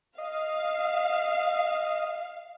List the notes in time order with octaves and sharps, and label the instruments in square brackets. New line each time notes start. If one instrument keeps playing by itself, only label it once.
[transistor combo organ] D#5 [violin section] F5